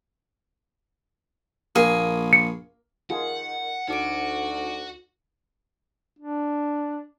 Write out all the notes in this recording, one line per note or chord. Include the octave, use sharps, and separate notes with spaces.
A#1 A#3 G#4
C#7
D#3 F4 G#4 F#5
D2 D#4 F#4 F#5 D6 D7
D4